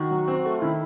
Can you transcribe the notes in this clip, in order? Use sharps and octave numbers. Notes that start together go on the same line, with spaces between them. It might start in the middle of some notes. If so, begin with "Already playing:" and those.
Already playing: D#3 F#4
F#3
C4
A3
D#3 E4